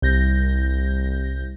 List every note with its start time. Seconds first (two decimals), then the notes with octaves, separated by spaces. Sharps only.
0.02 C2 G6 A#6